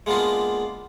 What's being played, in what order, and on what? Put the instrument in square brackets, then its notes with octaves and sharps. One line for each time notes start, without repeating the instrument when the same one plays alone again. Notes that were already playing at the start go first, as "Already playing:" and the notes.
[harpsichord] G#3 A#3 B3 D4 F4